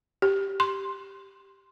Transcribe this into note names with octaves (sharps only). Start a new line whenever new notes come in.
G4
C6